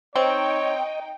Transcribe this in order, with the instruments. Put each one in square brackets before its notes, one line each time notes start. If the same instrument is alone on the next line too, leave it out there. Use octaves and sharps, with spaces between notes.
[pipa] C4 [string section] D#4 G5 [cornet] C#5 [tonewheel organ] D#5